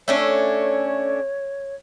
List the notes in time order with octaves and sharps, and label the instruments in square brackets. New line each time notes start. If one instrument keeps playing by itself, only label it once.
[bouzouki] A3 C#4 D4 [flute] C#5